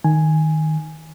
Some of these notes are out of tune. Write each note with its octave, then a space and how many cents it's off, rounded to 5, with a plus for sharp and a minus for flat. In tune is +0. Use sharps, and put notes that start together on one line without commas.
D#3 +0 G#5 +0